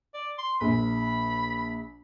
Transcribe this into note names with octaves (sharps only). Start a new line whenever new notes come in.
D5
C6
A#1 B5